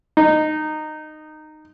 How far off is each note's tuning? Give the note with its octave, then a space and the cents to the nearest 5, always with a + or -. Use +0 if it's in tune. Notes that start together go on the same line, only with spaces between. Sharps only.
D#4 -15